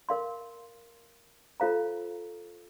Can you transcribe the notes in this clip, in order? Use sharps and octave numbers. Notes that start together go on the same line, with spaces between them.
A#4 F5 C6
F4 A4 C5 F5 A#5